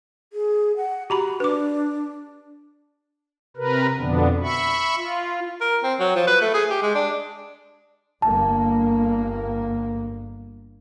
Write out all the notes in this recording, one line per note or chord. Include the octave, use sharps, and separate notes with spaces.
G#4
F#5
F#4 G4 A#5 B5
D4 B4 D6
C3 A#4 B4
F2 B2 D3 B3 D4
E5 B5 C#6
F4
A#4
C4
F#3
F3
B4
A3
G#4
G4
G#3
D4
G1 G2 A#3 A5